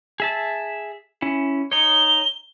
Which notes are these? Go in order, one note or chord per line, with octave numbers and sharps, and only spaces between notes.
G#4 E5 A5
C#4 E4
D#4 C#5 G7